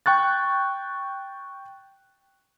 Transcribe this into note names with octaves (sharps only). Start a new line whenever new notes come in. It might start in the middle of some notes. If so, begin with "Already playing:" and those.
G5 C#6 F#6 A6